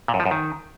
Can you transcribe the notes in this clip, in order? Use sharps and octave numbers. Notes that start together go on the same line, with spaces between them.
A#2
F#2
F3
F#2
D#3